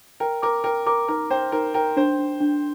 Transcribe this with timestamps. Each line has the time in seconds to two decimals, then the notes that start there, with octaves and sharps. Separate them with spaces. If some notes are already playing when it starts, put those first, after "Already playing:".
0.20 A#4 G5
0.42 A#4 D6
0.64 A#4 G5
0.86 A#4 D6
1.08 D#4 A#4
1.30 C5 G5
1.52 D#4 A#4
1.74 A#4 G5
1.97 D4 C5
2.19 D4
2.41 D4